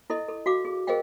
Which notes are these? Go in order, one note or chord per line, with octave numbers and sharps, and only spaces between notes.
E4 A4 D#5
A4
F#4 F5 D6
G#4
G#4 A#4 C5 D#5 F5 G5